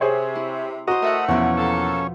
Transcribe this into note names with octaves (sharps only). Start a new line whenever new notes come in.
C3 G#4 C5 C#5
E4
F#4 C5 D#5 A#5
A3 A#4 E5 F#5
E2 B2 F3 C#4 E4
A#3 A4